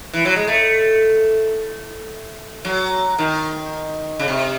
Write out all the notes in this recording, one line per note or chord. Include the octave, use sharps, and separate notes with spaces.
E3
F#3
G#3
A3
F#3
D#3
C#3
C3